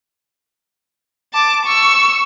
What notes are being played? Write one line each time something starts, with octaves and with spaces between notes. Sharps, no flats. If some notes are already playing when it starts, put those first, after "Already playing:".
A5 D6
C#6 E6